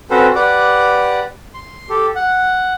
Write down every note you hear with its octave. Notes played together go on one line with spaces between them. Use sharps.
C4 C#4 F#4 A4 B4 C5
G4 B4 D5 F#5 D6
C6
G4 A4
F#5